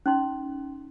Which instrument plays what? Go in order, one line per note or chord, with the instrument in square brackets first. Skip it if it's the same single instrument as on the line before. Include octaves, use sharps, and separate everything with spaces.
[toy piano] C#4 D#4 C6